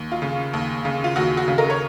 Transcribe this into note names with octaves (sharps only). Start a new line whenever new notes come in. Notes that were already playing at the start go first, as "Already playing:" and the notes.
Already playing: D#2
F4
C#3
D#2
C#3
F4
D#2 F#4
F#4
C#3
A#4
C#5